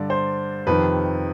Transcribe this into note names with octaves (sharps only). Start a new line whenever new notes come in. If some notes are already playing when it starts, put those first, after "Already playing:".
Already playing: G2 D3 D5
C5
F2 C3 D#3 B4